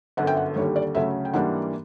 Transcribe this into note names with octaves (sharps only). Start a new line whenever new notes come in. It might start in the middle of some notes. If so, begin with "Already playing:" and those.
G1 F#2 D3 F#5
G5
F#5
D#2 D3 G3 C#5
D5
D2 C#3 F#3 A3 E5
G5
G#2 E3 G3 A#3 D4 F#5